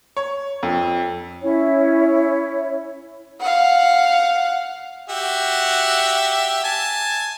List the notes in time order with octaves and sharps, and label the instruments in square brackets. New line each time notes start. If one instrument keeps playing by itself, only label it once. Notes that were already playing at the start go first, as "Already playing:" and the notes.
[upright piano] C#5
F2
[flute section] C#4 E4 C#5
[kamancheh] F5 F#5
[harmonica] F#4 G4 E5
G#5 A5